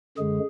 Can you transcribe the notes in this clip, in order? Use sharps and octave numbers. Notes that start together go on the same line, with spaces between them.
F#2 D3 G#3 G#4